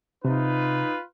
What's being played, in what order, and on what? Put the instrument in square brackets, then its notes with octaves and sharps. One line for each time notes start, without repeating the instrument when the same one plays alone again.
[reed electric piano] C3 [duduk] D#4 [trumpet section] F4 B4